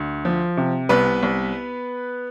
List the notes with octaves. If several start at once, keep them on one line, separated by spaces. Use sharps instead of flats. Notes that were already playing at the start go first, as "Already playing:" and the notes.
Already playing: D2
F3
C3
C2 B3 B4
C2